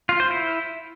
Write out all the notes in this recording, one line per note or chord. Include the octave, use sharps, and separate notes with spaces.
F4
C5
E4